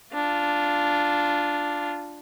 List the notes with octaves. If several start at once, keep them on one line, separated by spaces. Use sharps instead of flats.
D4 F4